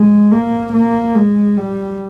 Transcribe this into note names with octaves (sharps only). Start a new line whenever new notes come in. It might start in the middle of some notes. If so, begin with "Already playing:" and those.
Already playing: G#3
A#3
A#3
G#3
G3